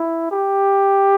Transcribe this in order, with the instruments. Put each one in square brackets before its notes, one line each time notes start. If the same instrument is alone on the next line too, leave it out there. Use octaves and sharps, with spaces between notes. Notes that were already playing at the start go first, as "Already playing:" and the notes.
Already playing: [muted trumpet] E4
G4